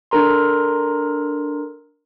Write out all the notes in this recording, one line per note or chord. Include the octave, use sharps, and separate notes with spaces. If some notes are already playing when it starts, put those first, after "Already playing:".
D4 A4 A#4 A#5 C6